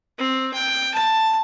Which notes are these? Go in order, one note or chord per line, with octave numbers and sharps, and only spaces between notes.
C4
G5
A5